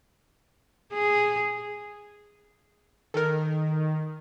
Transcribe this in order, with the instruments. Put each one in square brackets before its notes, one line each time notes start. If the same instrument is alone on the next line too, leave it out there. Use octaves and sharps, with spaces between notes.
[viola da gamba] G#4
[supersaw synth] D#3 [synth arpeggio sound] A4 A#4